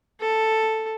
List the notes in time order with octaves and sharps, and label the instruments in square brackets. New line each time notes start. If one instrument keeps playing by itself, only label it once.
[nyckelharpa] A4